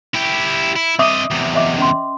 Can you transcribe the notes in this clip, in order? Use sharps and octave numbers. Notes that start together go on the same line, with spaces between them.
E4 G4
E4
C4 D#5 E5 D6 D#6
E2 C3
D#5 E5 D6
C#4 C6